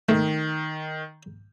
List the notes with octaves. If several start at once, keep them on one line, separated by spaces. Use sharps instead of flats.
D#3 A3